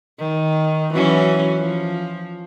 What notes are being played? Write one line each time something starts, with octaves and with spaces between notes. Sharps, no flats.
D#3
E3 F#3 C#4
F3